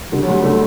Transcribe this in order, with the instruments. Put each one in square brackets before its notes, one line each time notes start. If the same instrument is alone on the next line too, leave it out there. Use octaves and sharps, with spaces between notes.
[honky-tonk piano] D3 [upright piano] G3
[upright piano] F#3
[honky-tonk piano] D2 [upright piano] G3
[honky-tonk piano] D3 [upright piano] A3